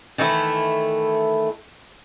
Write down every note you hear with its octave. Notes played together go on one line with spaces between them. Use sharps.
D#3 E3 A3 E4